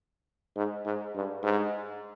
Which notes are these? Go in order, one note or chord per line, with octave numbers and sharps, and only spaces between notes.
G#2
G#2
G2
G#2